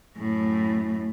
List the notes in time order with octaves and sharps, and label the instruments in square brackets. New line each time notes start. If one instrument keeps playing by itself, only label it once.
[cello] F#2 A2